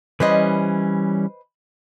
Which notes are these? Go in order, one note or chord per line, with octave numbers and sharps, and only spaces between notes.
E3 G3 C#4 B4 C5 D#5